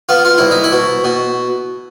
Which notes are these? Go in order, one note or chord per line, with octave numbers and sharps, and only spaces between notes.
B3 F4
F4
C2 E4
D#4
E4
B2
B2